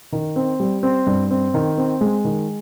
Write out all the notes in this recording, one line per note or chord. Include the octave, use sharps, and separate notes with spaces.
D#3
C4
G3
C4
G2
C4
D#3
C4
G#3
D#3